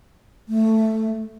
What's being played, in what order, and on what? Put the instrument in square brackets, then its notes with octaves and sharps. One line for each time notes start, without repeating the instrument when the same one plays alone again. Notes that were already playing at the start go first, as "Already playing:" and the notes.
[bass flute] A3